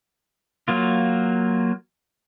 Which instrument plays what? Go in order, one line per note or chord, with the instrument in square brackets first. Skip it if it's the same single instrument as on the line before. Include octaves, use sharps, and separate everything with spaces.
[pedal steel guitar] F#3 A#3 F4